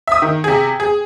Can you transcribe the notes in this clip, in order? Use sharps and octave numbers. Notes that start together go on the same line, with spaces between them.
E5 D#6
D#3
C3 G#4
G#4